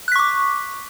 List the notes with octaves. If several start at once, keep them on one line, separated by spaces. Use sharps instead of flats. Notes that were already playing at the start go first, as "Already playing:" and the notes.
C#6 D6 F#6 B6